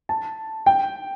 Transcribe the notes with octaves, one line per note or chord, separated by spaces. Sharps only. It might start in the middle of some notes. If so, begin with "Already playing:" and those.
A5
G5